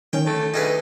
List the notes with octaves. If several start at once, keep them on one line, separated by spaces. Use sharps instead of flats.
D#3 C#4 G5
A3
D2 D#4 G#4 B4